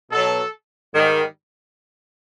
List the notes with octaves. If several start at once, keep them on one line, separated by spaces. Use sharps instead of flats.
B2 F#3 A4
G#2 D#3 G3